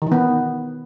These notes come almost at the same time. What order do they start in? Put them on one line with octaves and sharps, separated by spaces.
D#3 E3 B3